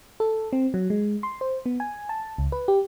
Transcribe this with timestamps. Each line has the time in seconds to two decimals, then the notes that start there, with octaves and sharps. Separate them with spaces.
0.20 A4
0.53 C4
0.74 F#3
0.90 G#3
1.23 C6
1.41 C5
1.66 B3
1.80 G#5
2.09 A5
2.38 C#2
2.52 B4
2.68 G4